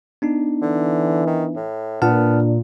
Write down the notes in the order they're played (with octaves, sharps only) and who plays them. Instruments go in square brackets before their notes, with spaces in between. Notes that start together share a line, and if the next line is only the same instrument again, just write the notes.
[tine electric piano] B3 D4 D#4
[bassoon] D3 [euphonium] E3
[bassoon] D#3
A2
[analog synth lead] A#2 [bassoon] B3 [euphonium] D4 [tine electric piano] F#5 A5 F6